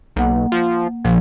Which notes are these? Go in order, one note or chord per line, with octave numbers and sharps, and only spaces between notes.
B1 A#3 F#5
F3
A#1 F3